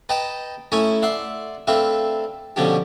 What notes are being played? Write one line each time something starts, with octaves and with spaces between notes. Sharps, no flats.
B4 D#5 G5 A5 A#5
A3 C#4 E4 A#5 C#6 D#6
D5 E5 F#5 C6
A3 C4 D4 B4 E5 F5
B2 D3 F3 C#4 D4 G4